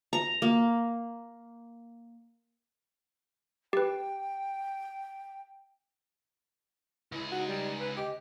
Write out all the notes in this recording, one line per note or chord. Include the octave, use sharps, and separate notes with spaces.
A#5
A#3
G4 B4 G5
C#2 E4 G#4
D#4 F#4
G3
B4
G4 D#5